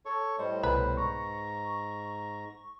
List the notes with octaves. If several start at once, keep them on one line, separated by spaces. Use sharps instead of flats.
A4 C#5 C#6
A2 G3 C5 D#5
C2 B2 B4
G#2 A#5 C#6